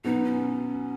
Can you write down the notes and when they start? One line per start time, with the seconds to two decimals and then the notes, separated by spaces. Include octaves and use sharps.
0.04 B2 F#3 B3 D#4
0.24 C#4